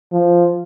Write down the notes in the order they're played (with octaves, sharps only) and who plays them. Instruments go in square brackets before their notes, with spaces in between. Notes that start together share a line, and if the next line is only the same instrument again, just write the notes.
[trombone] F3